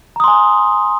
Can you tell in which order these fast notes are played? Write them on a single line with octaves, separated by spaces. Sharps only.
A#5 D#6 C6 G#5